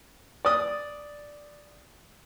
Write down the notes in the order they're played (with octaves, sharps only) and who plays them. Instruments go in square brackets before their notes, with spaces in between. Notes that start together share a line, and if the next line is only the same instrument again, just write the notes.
[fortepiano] D5 D#6